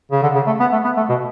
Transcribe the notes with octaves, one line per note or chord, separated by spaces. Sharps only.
C#3
D3
C#3
A3
B3
A3
B3
A3
B2